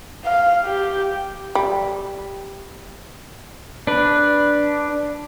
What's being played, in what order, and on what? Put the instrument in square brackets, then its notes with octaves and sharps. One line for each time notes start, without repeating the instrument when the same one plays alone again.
[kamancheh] F5
G4
[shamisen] G3
[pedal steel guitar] D4 B4